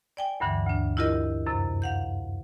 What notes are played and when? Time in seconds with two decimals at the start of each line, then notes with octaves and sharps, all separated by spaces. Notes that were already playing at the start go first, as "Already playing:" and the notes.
0.17 D5 G5 G#5
0.40 D2 G2 D3 E3
0.66 D2 D4
0.97 E4 F4 G4 A#4 D#5
1.46 F#2 C3
1.82 F5 F#5 G6